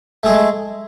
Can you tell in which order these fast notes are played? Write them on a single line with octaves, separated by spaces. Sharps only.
A3 G#4 G#3